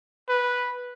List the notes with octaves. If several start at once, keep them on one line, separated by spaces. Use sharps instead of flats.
B4